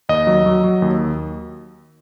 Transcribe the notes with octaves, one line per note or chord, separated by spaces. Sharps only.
D#2 D#5
F#3
F#3
F#3
D#2